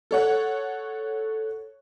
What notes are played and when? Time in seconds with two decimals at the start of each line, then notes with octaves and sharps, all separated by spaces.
0.11 A4 C#5 F#5